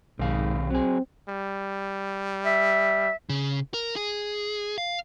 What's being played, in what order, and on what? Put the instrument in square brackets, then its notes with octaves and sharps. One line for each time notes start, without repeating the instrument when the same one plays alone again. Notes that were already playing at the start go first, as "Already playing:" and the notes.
[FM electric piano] B1 [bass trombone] G#2 [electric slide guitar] C3 D#3 F5
[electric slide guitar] F#3 G#4 [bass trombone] C4
[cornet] G3
[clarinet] E5
[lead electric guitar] C#3
A#4
G#4
F5